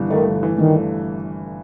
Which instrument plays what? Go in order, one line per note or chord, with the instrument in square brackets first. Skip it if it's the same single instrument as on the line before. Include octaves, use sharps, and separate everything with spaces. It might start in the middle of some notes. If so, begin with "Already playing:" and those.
Already playing: [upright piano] G1 G2 E3
[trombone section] D#3 [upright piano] A3
[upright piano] G1
E3
[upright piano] G2 [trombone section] D#3
[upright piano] A3